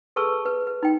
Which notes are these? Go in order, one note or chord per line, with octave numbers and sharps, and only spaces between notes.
G#4 A4 B4 A5 C#6 E6
B4
B4
D#4 G5